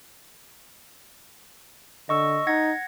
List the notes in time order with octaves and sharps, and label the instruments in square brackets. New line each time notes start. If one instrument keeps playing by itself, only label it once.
[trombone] D3 [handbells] D#5 C#6 E6
[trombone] D#4 [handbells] F#5 G#6 A#6